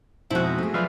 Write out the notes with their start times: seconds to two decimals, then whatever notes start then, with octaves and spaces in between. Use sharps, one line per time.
0.30 F2 G#2 B2 C4 E4 F#4
0.44 D#4
0.58 A3 G#4
0.74 F3 F#3 F4 B4 D5 E5